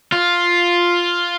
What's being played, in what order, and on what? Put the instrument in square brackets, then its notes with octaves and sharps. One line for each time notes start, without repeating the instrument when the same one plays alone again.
[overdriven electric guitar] F4